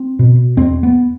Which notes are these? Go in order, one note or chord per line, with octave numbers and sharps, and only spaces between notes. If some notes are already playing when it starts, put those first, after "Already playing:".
Already playing: C4
B2
E2 C4
B3